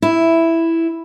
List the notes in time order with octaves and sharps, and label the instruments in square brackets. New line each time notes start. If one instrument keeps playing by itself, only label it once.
[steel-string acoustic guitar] E4